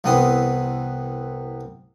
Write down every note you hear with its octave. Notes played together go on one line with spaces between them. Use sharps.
C2 E3 B3 C4 D#6